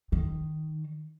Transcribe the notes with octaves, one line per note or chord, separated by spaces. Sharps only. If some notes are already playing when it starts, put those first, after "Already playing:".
D#3